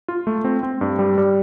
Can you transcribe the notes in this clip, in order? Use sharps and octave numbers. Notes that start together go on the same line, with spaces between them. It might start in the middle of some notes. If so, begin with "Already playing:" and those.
F4
A3
C4
C4
G2
G3
G3